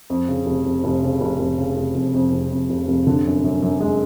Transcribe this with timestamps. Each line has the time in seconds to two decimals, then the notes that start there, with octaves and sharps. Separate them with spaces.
0.10 F2
0.28 C#3
0.46 F1
0.66 F1
0.84 F1
1.02 C#3
1.21 F1
1.39 F1
1.58 C#3
1.76 F1
1.95 F1
2.14 F2
2.32 F1
2.51 F2
2.70 F1
2.88 F1
3.07 D3
3.25 F#2
3.44 F#2
3.62 F#2
3.80 G#3